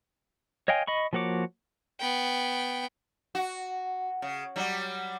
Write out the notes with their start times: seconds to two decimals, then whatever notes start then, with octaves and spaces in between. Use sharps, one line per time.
0.68 C#5 D#5 F5 G5 G#5
0.87 D#5 B5 C#6
1.13 F3 A#3 F#4 C#5 D6
2.00 B3 G5
3.35 F#4
4.22 C#3
4.56 F#3 G3